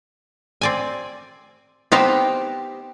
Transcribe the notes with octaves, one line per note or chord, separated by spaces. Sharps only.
C4 D5 G#5
B3 C4 D#4 G4 C5 F5